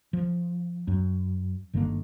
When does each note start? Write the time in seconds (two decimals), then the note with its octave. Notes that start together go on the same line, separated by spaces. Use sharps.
0.13 F3
0.87 F#2
1.73 G1 D3 D#3 A#3